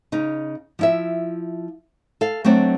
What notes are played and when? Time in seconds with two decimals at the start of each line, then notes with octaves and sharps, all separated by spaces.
0.12 C#3 D#4
0.79 F3 E4 E5
2.21 A4 F5
2.44 F#3 A3 C4 D4